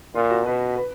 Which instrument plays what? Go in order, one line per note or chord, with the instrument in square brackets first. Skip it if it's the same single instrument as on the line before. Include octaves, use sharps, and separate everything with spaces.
[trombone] A#2 [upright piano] F4
[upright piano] F#4
[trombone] B2 [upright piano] B4
[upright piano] B4